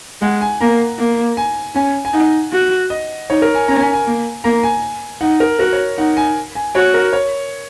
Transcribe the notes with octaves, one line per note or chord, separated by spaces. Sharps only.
G#3 F#5
G#5
A#3 A#5
A#3
G#5
C#4 G#5
G#5
D#4 F#5
F#4
D#5
D#4 C#5
A#4
G#5
C#4 A#5
G#5
G#5
A#3
A#3 A#5
G#5
D#4 F#5
A#4
F#4 A#4
C#5
D#4 F#5
G#5
G#5
F#4 C#5
A#4
C#5